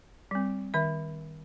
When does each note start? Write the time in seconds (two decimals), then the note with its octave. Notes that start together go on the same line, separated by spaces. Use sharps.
0.31 G3 C4
0.74 D#3 E5